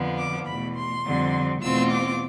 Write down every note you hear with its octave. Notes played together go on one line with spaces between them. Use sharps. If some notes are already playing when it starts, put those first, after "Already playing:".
Already playing: F2 D3 F3 B3
D6
E2 B2 A3 B5
C6
F2 D3 G3 C4
E2 B2 A3 C4 F4 E6
D6